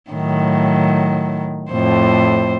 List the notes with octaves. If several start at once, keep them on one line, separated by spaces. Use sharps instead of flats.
A2 D#3 F#3
F2 A2 C5